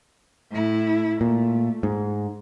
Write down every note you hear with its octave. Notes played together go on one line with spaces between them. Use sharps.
A2 E4
A#2 A3
G#2